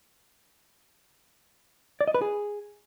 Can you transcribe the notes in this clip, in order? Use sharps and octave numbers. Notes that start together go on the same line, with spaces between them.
D5
D#5
B4
G#4